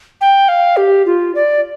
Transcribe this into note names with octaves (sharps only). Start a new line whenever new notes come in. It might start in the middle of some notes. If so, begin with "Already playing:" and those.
G5
F5
G4
F4
D5